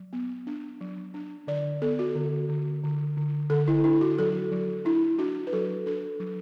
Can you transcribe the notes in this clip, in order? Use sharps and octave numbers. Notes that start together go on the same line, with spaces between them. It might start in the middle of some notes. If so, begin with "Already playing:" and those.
Already playing: F#3
B3
D4
F#3
D4
D3 D5
B3 A4
F#4
D3
D3
D3
D3
D3 A4
E4
D4 E4
F#4
F#3 A4
F#3
D4 E4
D4 F#4
B4
F#3 A4
D4 A4
F#3